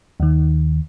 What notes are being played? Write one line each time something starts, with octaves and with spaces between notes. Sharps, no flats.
D#2 D#3